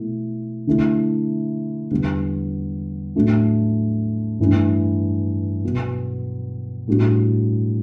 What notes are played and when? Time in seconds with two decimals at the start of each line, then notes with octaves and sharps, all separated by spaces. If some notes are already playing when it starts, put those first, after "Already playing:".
Already playing: B2 A3 E4
0.67 D3 A3 E4
1.91 E2 D3 G3 B3
3.15 A2 F#3 A3 D4
4.40 G2 E3 A3 D4
5.64 B2 F#3 B3
6.88 A2 G3 D4 F#4